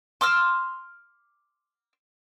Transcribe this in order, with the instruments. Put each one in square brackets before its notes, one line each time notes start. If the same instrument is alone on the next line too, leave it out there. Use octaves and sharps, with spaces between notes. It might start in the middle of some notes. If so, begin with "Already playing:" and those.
[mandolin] C6 D6 E6 F6